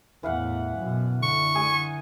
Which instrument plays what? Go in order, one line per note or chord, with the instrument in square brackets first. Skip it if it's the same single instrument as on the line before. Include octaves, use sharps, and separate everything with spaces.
[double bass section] E2 A2 [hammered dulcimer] E3 F5 F#5
[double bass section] F#2 B2
[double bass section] D3 [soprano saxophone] C#6
[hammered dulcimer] G#4 G#5 A#5